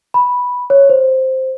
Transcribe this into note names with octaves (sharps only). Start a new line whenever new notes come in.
B5
C#5
C5